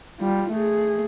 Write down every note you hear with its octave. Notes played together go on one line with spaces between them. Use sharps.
G3 F4
A3 G#4